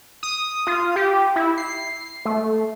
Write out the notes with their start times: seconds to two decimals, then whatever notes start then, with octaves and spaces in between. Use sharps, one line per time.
0.23 D#6
0.67 F4
0.96 G4
1.36 E4
1.58 C7
2.25 A3